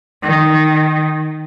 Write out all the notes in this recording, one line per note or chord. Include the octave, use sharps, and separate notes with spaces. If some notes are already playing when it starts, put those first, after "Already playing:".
D#3